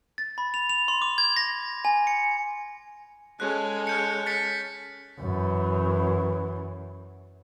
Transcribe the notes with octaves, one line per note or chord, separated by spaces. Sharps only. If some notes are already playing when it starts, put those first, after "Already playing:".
A6
B5
F7
F7
C6
D6
G#6
A#6
G#5
C#7
G#3 C#4 A4 F#6
F6 G6 C#7
A6 B6 C#7
F#2 E3